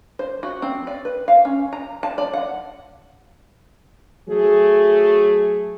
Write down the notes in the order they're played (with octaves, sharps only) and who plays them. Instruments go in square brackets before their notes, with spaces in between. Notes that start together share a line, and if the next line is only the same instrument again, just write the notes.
[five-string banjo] C5
F#4
C4
D5
B4
F5
C#4
A#5
A5
D5
F#5
[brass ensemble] F#3 A3 G#4